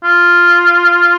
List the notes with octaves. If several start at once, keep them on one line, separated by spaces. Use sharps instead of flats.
F4